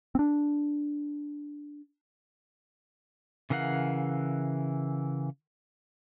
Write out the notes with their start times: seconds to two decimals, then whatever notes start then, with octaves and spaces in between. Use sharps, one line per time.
0.15 C4 D4
3.50 C#3 E3 A#4 F5 F#5